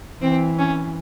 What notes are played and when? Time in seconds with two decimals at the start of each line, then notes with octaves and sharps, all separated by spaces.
0.22 E3 C4
0.59 C#4